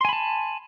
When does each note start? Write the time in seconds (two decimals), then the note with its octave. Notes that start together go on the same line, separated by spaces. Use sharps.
0.01 C6
0.05 G#5
0.09 B5
0.13 A5